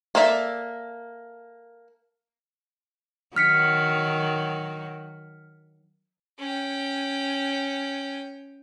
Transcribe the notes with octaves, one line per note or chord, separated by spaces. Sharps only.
A#3 A4 D5 E5
D#3 F#3 F6 B6 C#7
C#4 G5